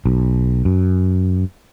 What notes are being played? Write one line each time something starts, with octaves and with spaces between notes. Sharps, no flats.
B1
F#2